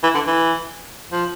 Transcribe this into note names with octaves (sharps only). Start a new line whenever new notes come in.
E3
D3
E3
F3